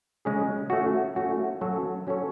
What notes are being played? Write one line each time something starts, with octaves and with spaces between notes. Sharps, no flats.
C#3 G#3 C#4 G#4
A3 C#4 F#4
A3 C#4 F#4
F#3 C#4 F#4 A4 C#5
F#3 C#4 F#4 A4 C#5